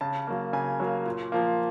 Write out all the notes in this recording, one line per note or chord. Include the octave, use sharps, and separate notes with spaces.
C#3 A5
F#3 A#3
C#3 G#5
F#3 A#3
A#2
F3 A#3